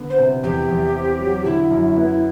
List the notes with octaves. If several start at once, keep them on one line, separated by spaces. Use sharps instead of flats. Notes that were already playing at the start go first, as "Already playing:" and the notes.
Already playing: D3 B3
C5
C3
E2 G4
E2
C4
F#3
D3 E4
F#2
B3